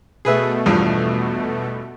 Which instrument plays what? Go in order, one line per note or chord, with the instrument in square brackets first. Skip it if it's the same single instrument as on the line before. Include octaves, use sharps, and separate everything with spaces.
[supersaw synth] B2 A3 [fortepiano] G#4 B4 E5
[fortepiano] E2 G2 F3